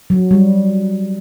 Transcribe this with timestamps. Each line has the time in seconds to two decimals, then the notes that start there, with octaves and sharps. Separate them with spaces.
0.10 F#3
0.31 G3